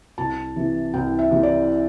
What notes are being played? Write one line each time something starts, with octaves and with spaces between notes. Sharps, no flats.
C2 A5
C3 E3
C2 G5
E5
C3 E3
D5